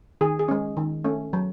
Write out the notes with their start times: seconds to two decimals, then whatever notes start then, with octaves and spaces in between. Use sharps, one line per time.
0.21 D#3 G#4
0.39 G#4
0.48 G#3 C#4
0.77 D#3
1.04 A3 C#4
1.33 F#3